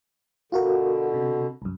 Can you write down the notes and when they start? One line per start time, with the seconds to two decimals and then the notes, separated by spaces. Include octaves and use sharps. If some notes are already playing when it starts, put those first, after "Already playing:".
0.52 B2 D3 F4 F#4 A#4
1.14 C3
1.62 C2 F#2